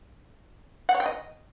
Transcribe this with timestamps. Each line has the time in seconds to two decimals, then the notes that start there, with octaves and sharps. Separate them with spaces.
0.89 F#5
0.94 C#5
1.00 G5
1.06 D#5